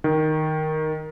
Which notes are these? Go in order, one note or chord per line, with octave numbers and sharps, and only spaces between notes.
D#3